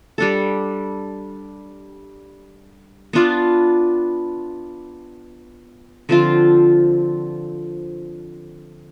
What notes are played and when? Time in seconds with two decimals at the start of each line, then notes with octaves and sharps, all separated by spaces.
0.18 G3 D4 A4
3.13 B3 D4 F4
6.09 D3 F3 C4 F4